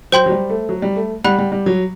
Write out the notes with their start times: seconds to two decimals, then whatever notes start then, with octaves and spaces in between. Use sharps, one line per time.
0.12 F#3 C5 G5 C6 G6
0.26 F#3
0.31 G3
0.50 A3
0.69 F#3
0.82 G3
0.96 A3
1.24 G3 F#5 B5 F#6
1.39 G3
1.52 G3
1.66 F#3